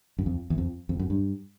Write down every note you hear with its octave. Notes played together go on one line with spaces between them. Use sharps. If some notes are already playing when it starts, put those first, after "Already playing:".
F#2
F2
E2
F2
F2
F#2
G2